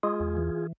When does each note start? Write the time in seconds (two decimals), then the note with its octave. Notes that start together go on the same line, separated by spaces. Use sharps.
0.03 G#3 F4 G#4
0.20 E2
0.37 E3